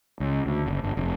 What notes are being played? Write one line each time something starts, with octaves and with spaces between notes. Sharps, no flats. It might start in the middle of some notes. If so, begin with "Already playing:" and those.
C#2
D2
F#1
G1
F1